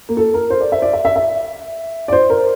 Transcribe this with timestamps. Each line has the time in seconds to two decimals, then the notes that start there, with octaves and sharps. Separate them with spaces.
0.09 A#3
0.17 A4
0.34 A#4
0.50 C5
0.61 D5
0.72 E5
0.82 D5
0.93 E5
1.05 E5
1.16 E5
2.08 D5
2.13 C5
2.30 A#4